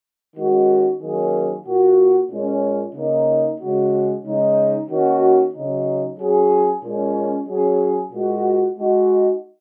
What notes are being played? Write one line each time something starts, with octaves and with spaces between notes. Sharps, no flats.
D#3 G#3 C#4 F#4
D#3 F#3 A#3 C#4 G#4
A#2 A#3 F#4
A#2 G#3 C#4
C#3 A#3 D#4
C#3 G#3 F#4
C#3 G#3 D#4
D#3 A#3 C#4 F#4
C#3 F#3 D#4
F#3 C#4 G#4
A#2 G#3 C#4
F#3 C#4 G#4
A#2 G#3 F#4
G#3 D#4 F#4